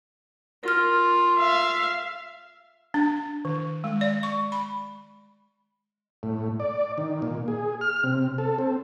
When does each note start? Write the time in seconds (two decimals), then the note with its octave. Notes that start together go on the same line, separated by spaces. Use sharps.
0.63 F4 A#4 F6
1.38 E5 F5
2.94 D4
3.45 D#3
3.84 G#3
4.01 D5
4.23 C#6
4.52 B5
6.23 A2
6.60 D5
6.98 D#3
7.22 A#2
7.48 G#4
7.81 F6
8.04 C3
8.38 A4
8.58 C4